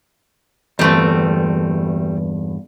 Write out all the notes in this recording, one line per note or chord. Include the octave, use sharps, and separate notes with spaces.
E2 G2 G3 A3 C4